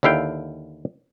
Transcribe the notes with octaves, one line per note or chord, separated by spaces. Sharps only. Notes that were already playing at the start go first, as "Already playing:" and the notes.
D#2 D3 E4 F5 G5